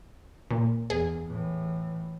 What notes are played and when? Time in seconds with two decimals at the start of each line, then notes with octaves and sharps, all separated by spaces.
0.51 A#2
0.90 E2 G#4
1.27 A2 E3